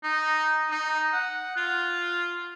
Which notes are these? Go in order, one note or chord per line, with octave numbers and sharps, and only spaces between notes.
D#4
D#4
F#5
F4